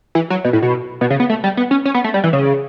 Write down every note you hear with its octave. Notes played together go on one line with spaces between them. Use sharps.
E3
F#3
B2
A2
B2
B2
C#3
B3
A3
G3
B3
C#4
C#4
B3
A3
G3
E3
C#3